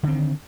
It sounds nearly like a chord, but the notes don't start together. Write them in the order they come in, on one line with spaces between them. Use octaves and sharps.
D3 C4 D#3